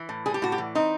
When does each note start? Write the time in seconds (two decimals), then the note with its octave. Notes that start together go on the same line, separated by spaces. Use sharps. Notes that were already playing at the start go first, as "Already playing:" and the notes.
Already playing: E3
0.09 A2
0.26 G3 G#4
0.34 G4
0.42 A2 F#4
0.52 G4
0.58 E3
0.75 C4 D#4